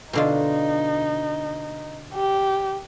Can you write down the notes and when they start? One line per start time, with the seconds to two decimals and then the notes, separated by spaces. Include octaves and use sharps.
0.13 B2 D3 D#4 F4
2.14 G4